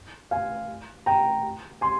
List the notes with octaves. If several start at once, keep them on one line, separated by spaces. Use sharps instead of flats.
F5 G#5
G5 A#5
G#5 C6